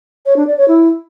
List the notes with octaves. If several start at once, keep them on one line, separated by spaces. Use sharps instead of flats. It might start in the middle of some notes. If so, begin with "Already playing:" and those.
C#5
D4
D5
C#5
E4